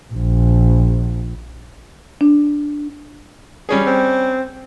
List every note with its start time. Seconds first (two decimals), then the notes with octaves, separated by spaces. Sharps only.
0.13 A#1
2.21 D4
3.69 G3 C#4 G#4
3.87 C4